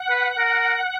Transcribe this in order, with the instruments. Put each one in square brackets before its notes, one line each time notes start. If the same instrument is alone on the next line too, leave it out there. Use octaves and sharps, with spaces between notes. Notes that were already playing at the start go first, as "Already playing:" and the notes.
Already playing: [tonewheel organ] F#5
[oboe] B4
A#4